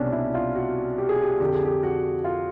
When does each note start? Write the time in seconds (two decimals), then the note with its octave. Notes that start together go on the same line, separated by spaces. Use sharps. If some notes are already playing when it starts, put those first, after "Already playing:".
Already playing: C2 B2 C#4 D4
0.12 E4
0.34 F4
0.55 F#4
0.98 G4
1.09 G#4
1.21 G4
1.40 F2 D3 G4
1.53 G#4
1.65 G4
1.83 F#4
2.24 F4